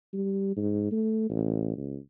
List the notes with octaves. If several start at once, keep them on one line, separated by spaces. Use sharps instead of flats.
G3
G#2
A3
A1
C#2